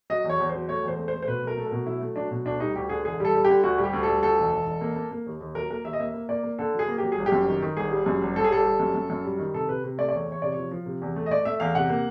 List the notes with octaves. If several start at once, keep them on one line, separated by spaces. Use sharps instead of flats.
F#3 D#5
E2
C#5
E2
F#3 C5
A3 C#5
E2 C5
A3
C5
A3
C5
B2 B4
F#3 A#4
A3 A4
A#4
B2
F#3 E4
A3
F#3 D4
B2
D2 D4
G3 D#4
D2 G4
D3 G#4
E1 G#4
G3 A4
G3
D3 G4
D2 F#4
G3
G4
D2
A4
G3
D2 A4
E1
E1
E1
A#3
A#3
A#3
D#2
D#2
F#3 A#4
A#3 A#4
D#2 E5
D#5
A#3 E5
A#3
A#3 D5
A#3
D3 A4
F#3
G#4
A#3
F#3 G4
G#4
G1
G4
F#2
D#3
D#3
G1 G#4
G3
F#2
G1
G1 A4
G#4
G3 A4
G3
F#2
F#2
F#2
G3
D#3
C3 A4
C3 B4
C3
A3 D5
D5
E2 C#5
E2 C#5
C3 D5
F3 C#5
F3
C3
E2
A3
D#5
A3 D5
A3 E5
E2 F5
C3 F#5
A#3